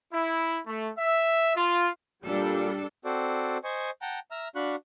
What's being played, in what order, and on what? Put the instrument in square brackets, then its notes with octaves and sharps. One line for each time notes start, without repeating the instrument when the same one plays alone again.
[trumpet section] E4
A3
E5
F4
[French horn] A#2 [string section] G3 [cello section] D4 A4
[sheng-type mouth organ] C4 F#4 A4 C5 D5
C5 D#5 G#5 C#6
F#5 G5 A5 A#5
E5 A#5 E6 F6
D4 F#4 F5 B5 C#6 F#6